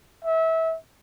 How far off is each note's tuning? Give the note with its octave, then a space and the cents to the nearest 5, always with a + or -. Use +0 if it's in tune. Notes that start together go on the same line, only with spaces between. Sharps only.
E5 -25